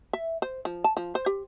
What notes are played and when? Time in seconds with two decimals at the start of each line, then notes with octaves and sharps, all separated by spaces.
0.13 E5
0.42 C5
0.65 F3
0.84 A5
0.97 F3
1.15 C5
1.26 G4